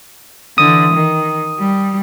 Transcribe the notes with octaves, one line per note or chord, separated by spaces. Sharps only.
D3 E3 D#6
D#3
G3